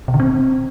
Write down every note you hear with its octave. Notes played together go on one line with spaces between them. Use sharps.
B2
D3
C4